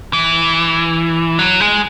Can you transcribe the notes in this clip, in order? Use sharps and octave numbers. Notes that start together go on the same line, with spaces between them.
E3
F#3
G#3